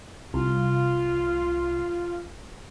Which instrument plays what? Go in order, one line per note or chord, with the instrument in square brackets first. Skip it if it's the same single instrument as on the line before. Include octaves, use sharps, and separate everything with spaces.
[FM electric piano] C2 [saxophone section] F4